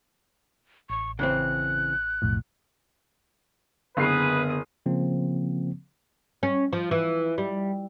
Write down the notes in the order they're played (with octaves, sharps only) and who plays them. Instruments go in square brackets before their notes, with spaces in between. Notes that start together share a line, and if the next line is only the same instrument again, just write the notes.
[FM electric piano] A1 [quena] C#6
[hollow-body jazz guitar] C#3 E3 C4 [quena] F#6
[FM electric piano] B1 F2 A2
[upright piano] F#1 C7 [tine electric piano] D3 B3 [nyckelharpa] G#4 D#6 [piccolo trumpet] B4
[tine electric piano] C#3 F3 A#3 C4
[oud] C#4
F3
E3
G3